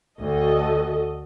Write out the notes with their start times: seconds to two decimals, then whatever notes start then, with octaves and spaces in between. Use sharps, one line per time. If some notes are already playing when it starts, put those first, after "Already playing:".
0.20 D2 F#4 A4 D#5